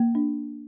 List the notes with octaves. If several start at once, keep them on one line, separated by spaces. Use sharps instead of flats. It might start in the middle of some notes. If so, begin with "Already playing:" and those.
Already playing: A#3
D4